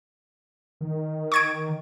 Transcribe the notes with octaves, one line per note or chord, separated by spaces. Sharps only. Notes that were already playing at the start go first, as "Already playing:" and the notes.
D#3
C#6 G#6 D7